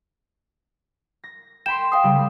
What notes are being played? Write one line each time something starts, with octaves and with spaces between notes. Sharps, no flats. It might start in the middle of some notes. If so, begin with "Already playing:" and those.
A#6
G5 B5 C6 E7
F5 G5 D#6 C7
C#3 G3